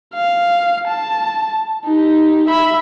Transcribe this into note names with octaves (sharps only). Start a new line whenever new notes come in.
F5
A5
D#4 G4
E5 B5